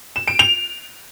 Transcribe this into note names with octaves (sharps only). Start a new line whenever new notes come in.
E7
D7
F7